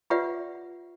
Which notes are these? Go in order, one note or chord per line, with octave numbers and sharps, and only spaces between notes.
F4 G4 B4 D5 E5 F#5